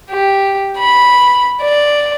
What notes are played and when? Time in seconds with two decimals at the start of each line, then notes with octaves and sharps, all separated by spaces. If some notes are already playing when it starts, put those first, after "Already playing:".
0.10 G4
0.77 B5
1.62 D5